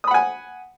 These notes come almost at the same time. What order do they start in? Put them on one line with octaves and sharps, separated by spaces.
D#6 B5 F#5 G#5